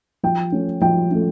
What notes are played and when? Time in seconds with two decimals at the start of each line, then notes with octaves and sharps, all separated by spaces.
0.23 F3 G5
0.52 A3 C#4
0.81 F3 G5
1.11 A3 C#4